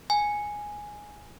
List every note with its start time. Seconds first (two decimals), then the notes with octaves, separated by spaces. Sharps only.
0.10 G#5